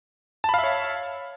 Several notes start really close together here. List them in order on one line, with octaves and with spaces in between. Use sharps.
A5 B5 F5 E5 C#5